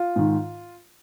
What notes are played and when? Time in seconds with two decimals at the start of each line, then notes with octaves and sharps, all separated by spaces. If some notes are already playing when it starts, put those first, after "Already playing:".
Already playing: F4
0.16 G#2 D#3